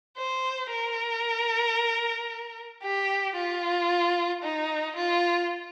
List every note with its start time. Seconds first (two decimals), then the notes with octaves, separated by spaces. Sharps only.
0.18 C5
0.71 A#4
2.83 G4
3.36 F4
4.43 D#4
4.96 F4